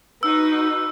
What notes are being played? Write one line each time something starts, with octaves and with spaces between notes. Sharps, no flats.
D#4 F#4 B4 E6